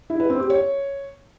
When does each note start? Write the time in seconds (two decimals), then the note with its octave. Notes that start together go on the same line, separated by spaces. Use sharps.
0.10 E4
0.20 B4
0.30 C4
0.40 G4
0.50 C#5